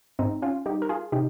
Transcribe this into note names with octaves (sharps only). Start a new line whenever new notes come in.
G#2 C4 D#4
C#4 F4
G3 D#4 G4
A#4
F4 G#4
C3 D#4 G4